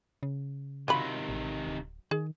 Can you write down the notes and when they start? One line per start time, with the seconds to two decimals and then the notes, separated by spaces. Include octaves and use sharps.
0.23 C#3
0.88 C3 D#3 F#3 F4 B5
1.29 A1
1.66 D1
2.11 D#3 G#4